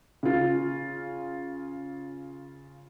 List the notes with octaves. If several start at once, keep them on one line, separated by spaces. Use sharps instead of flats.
C#3 F4